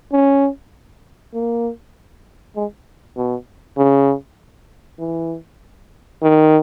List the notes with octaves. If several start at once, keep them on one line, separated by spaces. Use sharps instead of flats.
C#4
A#3
G#3
B2
C#3
E3
D#3